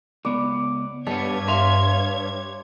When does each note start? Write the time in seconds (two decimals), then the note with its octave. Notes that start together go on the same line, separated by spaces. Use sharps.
0.25 C#2 B3 D5
1.07 G2 G3 B3 C#5 A5 G#6
1.48 B4 E5 F5 C6